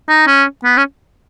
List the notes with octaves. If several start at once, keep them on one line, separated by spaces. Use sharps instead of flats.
D#4
C#4
B3
C#4